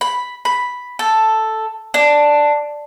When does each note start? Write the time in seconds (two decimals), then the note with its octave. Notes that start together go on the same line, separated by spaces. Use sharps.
0.01 B5
0.45 B5
0.99 A4
1.94 D4